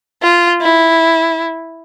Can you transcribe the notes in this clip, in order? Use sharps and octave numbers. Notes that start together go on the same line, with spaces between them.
F4
E4